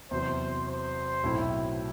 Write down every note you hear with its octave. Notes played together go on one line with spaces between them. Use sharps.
E2 C3 F#3 C5
C5
B1 A2 F#3 C4 E4